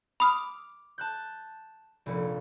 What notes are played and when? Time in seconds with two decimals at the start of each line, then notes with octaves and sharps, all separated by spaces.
0.20 B5 D6 D#6 F6
0.98 A5 F#6 G6
2.06 F1 A#1 C#7